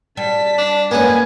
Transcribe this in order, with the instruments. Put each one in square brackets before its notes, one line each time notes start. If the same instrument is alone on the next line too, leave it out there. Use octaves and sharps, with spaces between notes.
[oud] G3 [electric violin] A5 B6
[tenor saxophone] D4
[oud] F#2 G#3 C#4 [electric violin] A#3 [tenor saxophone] B3 [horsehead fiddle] G#5